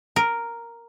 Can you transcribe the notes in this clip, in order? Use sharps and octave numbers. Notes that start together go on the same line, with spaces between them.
A#4